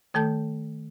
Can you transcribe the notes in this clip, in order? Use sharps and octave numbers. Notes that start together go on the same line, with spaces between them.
D#3 A3 A4 A5 G6